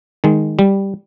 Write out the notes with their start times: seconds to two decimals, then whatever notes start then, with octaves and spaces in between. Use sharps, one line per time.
0.24 D#3 G#3
0.59 G3